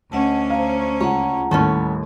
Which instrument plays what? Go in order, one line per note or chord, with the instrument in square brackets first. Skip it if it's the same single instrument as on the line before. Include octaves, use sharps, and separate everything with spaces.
[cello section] D2 C#4 [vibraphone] D#5 F#5 A5
[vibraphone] C5 A5 A#5 [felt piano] F5
[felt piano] C#2 [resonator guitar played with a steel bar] C#5 [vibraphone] F#5 A5 A#5
[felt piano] D#2 A2 [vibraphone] G3 [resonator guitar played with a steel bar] A3 B3 C#4